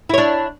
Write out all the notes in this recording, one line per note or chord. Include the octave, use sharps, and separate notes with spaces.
D4 E4 C#5